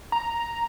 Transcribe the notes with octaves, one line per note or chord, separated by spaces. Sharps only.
A#5